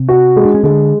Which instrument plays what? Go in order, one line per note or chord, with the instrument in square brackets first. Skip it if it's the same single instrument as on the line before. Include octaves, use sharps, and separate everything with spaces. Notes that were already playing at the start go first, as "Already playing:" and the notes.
Already playing: [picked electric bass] C3 C4
[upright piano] F#4
G#3
[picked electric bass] D4
C#4
[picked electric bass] D3 D4 [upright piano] G#3